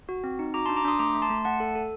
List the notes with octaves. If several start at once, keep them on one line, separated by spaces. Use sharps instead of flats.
F#4
C4
D#4
F#4 A#5 D6
A5 C6
D4
A#5 D6
D4 C6 D#6
A3 A#5 D6
A3
A5 C6
A3
A3 F#5 A5
A4
A4